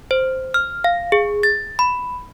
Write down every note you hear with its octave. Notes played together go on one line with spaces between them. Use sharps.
C5
F6
F5
G#4
A6
B5